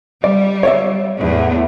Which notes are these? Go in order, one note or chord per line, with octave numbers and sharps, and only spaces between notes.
G3 D5
C#5 D5 E5
E2 A2